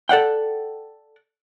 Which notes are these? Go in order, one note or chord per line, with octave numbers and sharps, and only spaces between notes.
A4 D5 F#5 G5